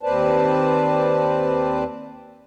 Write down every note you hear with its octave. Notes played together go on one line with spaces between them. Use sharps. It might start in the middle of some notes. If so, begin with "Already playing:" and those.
D#2 C4 B4 C5 D5 A5